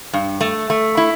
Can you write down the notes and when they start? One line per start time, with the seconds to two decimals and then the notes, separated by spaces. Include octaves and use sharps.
0.13 G2
0.41 A3
0.70 A3
0.97 E4